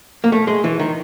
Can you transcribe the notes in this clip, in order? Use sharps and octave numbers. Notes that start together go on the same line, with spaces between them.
A#3
A3
G#3
E3
D#3